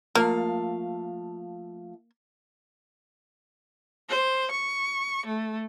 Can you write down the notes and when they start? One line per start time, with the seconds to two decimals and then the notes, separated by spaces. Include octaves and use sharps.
0.15 F3 A3 A#3 F5
4.09 C5
4.51 C#6
5.25 A3